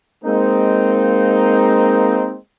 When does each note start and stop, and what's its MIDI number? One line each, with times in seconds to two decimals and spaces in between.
0.24 2.36 56
0.24 2.36 58
0.24 2.36 60
0.24 2.36 63